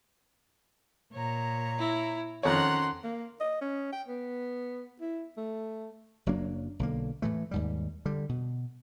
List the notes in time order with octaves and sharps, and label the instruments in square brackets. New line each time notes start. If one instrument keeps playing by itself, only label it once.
[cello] A#2 [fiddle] C#5 A#5
[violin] E4
[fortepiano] F2 C#5 [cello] D#3 C#4 [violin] F#5 C6 [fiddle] A#5 F#6
[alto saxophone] A#3
D#5
C#4
G5
B3
E4
A3
[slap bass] F#1 F#3 A#3 D4
B1 D3 A#3
A2 E3 A3
D#2 G#2 G3
D3 G3
B2